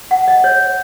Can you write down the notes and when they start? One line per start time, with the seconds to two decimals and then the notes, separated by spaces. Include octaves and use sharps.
0.11 F#5
0.28 D#5
0.44 C#5